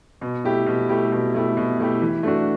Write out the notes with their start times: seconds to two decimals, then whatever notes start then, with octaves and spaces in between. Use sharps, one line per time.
0.21 B2
0.44 A3 E4 G4
0.66 B2
0.89 A3 E4 G4
1.12 B2
1.34 A3 E4 G4
1.57 B2
1.80 A3 E4 G4
2.02 E3
2.23 A3 D4 F#4